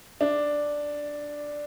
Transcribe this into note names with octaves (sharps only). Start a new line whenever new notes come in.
D4